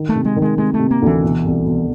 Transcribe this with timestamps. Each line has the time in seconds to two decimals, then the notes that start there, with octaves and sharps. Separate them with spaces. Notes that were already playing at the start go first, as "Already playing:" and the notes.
Already playing: D#3
0.09 A3
0.15 C3
0.25 G#3
0.36 D#3
0.42 G#3
0.58 C3 G#3
0.74 A3
0.79 C3
0.91 A#3
1.02 D2 E3
1.23 B2
1.45 C2
1.66 B2